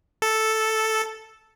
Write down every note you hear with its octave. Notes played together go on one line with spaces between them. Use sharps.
A4